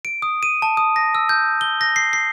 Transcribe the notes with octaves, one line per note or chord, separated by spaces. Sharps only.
D7
D#6
D#7
A5
D#6
A#6
E6
G6
G7
A#6
C7
C7